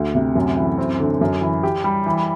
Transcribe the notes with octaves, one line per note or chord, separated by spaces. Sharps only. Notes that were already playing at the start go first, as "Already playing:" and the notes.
Already playing: D2
C3
F#2
E3
C4
D3
F#2
E3
G4
G3
E3